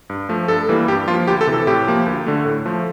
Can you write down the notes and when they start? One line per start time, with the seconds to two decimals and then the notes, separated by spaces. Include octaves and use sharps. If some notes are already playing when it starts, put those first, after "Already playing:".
0.10 G2
0.29 F3 A3
0.48 G2 A4
0.69 E3 G3 A#3
0.88 G2 G4
1.08 F3 A#3 F4
1.28 D2 G4
1.41 A4
1.47 C3 E3
1.54 A4
1.67 A2 G4
1.87 F3 A#3
2.07 D2
2.27 D3 A3
2.46 A2
2.66 F3 A3